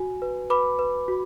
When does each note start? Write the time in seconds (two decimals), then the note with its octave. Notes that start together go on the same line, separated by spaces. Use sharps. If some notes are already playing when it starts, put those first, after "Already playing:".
Already playing: F#4 G#5
0.22 B4
0.50 B4 B5 D6
0.79 B4
1.08 F#4